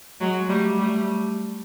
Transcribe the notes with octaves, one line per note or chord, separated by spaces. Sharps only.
F#3 G#3
G3 A3
G3 A3